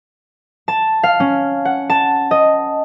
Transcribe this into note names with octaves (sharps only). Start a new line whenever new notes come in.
A5
F5
C#4
F#5
A5
D#5